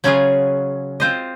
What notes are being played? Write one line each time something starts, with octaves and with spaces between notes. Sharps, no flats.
C#3 F#3 C#4 F4 G#4
C4 F4 C5 D#5